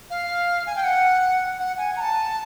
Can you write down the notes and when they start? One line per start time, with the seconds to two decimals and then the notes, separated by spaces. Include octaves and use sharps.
0.10 F5
0.67 G#5
0.75 G5
0.84 F#5
1.59 F#5
1.78 G#5
1.96 A#5
2.01 A5